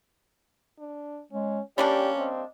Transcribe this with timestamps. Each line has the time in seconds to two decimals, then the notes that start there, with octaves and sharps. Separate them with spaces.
0.79 D4
1.32 G#3 C#4
1.78 G3 A#3 C#4 D4 G4 D5
2.17 C4 D#5